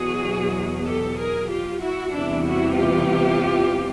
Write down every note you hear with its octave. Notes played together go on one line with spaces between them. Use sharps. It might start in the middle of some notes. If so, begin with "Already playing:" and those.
Already playing: E2 B2 F#3 F#4 G#4
G4 A4
G#4 A#4
F4 G4
E4 F#4
E2 C3 E3 G3 D4 E4
E4 F#4
F4 G4